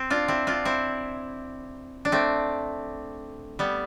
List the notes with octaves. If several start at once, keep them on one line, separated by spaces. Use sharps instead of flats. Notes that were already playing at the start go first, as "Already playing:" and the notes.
Already playing: C4
D4 F4
C4 E4
D4 F4
C4 E4
D4
A3 C4
G3 B3